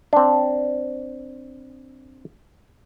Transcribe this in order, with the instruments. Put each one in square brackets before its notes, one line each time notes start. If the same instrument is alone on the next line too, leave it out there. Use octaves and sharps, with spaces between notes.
[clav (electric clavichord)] C4 D4